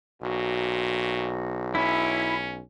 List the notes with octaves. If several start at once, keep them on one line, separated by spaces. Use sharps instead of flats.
B1 A#2 F#4
C#4 E4